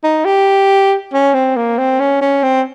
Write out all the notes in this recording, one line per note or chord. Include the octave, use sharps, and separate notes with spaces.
D#4
G4
C#4
C4
A#3
C4
C#4
C#4
C4